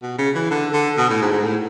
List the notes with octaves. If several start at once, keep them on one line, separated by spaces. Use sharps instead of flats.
B2
C#3
E3
D3
D3
B2
A2
G#2
G#2
A2